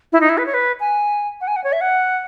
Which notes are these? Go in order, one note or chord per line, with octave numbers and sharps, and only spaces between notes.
E4
D#4
E4
B4
C#5
B4
G#5
F#5
G#5
F#5
C#5
E5
F#5